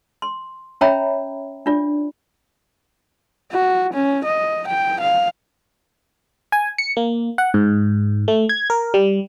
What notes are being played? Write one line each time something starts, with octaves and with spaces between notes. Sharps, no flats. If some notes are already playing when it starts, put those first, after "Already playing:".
C6
C#4 C#5 E5 G5 A#5 B5
D4 F4 D5
F#4
C#4
D#5
G5
F5
G#5
C#7
A#3
F#5
G#2
A3
G#6
A#4
G3